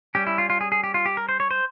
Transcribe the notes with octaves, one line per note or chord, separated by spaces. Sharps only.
G3 C#4 G4
E4
F4
F4
G#4
G#4
G4
F4
G4
A#4
C5
C#5
C5